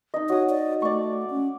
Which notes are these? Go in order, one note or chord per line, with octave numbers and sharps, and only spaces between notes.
D#4 D#5
F#4 C#5 D#6
D5
A3 D5 C#6
C#4